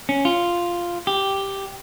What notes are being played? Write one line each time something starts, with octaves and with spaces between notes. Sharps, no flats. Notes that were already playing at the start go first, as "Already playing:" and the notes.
C#4
F4
G4